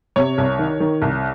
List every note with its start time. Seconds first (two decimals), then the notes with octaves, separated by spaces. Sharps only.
0.16 C3 C#5
0.38 C2
0.59 D#3
0.80 D#3
1.02 C2